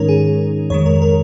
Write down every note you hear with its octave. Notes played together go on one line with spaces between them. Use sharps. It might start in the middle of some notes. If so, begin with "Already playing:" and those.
Already playing: G#2 D#3 G#3 C#4 D#4 A#4 C#5
G#4
F2 D#3 G#3 C#5
A#4
A#4